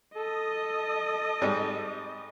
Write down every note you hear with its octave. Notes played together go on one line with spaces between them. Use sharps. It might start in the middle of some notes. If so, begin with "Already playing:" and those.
A4 D#5 D#6
G#2 G3